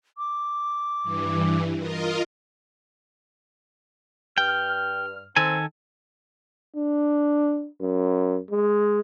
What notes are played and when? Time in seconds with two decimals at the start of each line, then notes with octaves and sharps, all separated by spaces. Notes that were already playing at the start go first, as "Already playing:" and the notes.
0.18 D6
1.03 G2 E3
1.79 F4 A#4 D#5
4.38 G2 G5 F6
5.36 D#3 C4 A4 G#5
6.76 D4
7.81 F#2
8.51 G#3